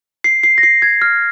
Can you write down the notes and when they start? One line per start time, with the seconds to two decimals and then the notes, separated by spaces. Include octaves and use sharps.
0.24 C7
0.43 C7
0.58 A#6
0.63 C7
0.82 G#6
1.02 F6